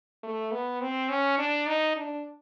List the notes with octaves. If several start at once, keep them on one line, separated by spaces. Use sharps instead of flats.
A3
B3
C4
C#4
D4
D#4
D4